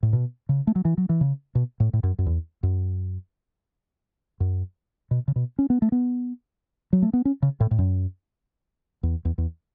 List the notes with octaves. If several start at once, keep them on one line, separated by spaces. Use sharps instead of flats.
A2
B2
C#3
A3
F#3
E3
F#3
E3
C#3
B2
A2
A2
F#2
F#2
E2
F#2
F#2
B2
C#3
B2
C#4
B3
A3
B3
F#3
A3
B3
C#4
C#3
A2
A2
F#2
E2
E2
E2